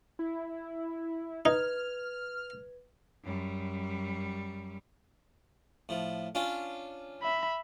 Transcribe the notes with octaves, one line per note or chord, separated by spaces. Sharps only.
E4
D#4 B4 F6 G#6
F#2 G3
A2 F3
C#4 D4 F4
E5 B5